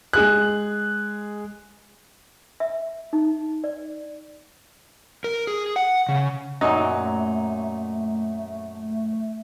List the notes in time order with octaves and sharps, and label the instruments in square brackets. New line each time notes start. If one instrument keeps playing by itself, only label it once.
[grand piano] G#3 G#4 F#6
[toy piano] E5
D#4
D5
[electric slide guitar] A#4
G#4
F#5
C#3
[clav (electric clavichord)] F#2 A#2 F#3 [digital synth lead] A3 [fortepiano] D#4